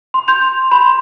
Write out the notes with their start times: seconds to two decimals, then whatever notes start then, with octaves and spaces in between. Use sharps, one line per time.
0.14 C6
0.28 C6 G6 F7
0.71 B5 C6